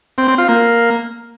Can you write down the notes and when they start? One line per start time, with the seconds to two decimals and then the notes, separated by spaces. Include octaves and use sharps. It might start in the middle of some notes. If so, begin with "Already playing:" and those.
0.18 C4
0.28 C4
0.38 F4
0.48 A#3